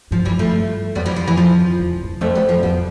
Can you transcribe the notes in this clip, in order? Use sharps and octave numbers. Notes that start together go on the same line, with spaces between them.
G2 F3
E3 G3
F3 A3
F2 G3 B3
E3 G3
F3
E3
F3
E2
E2
F2 F3 A3
G3 B3
F3
F2 G3 B3